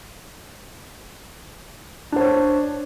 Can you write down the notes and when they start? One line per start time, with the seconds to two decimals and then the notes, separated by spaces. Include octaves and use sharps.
2.12 D4
2.16 C5
2.20 C#5